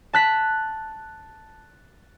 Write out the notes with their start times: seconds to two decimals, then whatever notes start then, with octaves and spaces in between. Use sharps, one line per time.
0.13 A5 F#6 B6